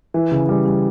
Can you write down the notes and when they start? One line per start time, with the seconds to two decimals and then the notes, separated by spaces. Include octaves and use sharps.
0.14 E3
0.32 C#3
0.49 G3
0.66 G3